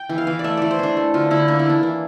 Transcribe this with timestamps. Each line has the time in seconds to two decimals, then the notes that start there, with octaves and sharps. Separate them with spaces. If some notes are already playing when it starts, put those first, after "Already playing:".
Already playing: G5
0.09 E3
0.18 F5
0.27 E3
0.39 D5
0.44 A3 E5
0.57 E3 D5
0.71 C5
0.79 E3 D4
0.97 A3
1.14 D3 F4
1.31 D3 E4
1.48 A#3 D4
1.59 E4
1.66 E3 D4
1.83 E3